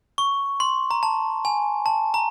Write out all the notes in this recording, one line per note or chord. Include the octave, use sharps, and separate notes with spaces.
C#6
C6
A#5
A5
G#5
A5
A#5